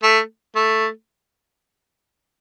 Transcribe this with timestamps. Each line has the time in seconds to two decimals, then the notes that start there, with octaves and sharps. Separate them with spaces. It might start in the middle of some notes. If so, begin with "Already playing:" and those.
0.03 A3
0.55 A3